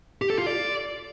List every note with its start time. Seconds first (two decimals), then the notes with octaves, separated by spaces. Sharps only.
0.22 G4
0.30 A4
0.38 F4
0.47 D5